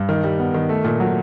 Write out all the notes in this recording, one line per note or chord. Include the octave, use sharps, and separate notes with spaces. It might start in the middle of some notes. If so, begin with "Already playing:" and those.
Already playing: G2
D#3
G3
B3
D#3
A3
A#2
F#3